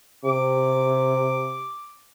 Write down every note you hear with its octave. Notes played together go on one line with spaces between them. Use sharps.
C3 D6